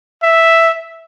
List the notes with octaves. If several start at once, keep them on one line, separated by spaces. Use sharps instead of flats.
E5